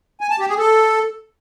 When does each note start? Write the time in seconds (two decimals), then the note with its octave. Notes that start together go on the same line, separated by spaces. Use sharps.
0.21 G#5
0.30 A5
0.39 G4
0.49 G#4
0.58 A4